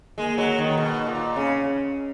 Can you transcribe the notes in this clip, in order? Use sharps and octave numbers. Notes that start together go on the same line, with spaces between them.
G#3 A#3
F#3
D#3
B2
A#2
C#3 C#4